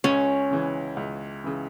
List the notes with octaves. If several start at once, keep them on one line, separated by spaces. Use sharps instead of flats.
C#2 C#4
C#3 E3
C#2
C#3 E3